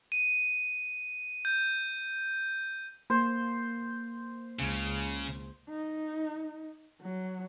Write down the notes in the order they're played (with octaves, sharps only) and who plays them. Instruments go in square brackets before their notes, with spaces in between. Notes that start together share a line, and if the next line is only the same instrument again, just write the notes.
[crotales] D#7
G6
[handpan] A#3 [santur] C5
[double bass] C#2 [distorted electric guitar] C#3
[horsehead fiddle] D#4
F#3